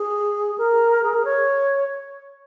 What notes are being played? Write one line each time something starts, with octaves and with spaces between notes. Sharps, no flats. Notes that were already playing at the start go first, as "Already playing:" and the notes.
Already playing: G#4
A#4
G#4
A#4
C#5